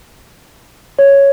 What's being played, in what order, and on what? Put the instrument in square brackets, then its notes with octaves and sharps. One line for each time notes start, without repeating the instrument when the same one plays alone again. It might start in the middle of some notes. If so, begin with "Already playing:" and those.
[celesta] C#5